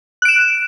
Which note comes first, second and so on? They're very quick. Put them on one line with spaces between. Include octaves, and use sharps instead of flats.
F#6 D7 E7